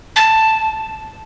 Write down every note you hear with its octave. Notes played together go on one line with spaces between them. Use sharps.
A5